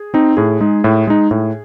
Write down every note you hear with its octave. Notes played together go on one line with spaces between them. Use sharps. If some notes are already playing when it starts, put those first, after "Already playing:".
Already playing: G#4
C4 D#4
A2 G#4
G#3 D#4
A2
G#3 D#4
A2